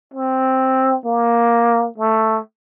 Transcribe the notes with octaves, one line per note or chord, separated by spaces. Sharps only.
C4
A#3
A3